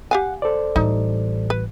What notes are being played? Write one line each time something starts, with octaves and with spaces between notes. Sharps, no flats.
G4 F5 F#5 G#5
A4 C5 D5
A1 G3 D#4
B4